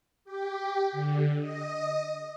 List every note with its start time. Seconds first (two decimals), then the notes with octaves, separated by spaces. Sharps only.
0.25 G4
0.92 D3
1.40 D#5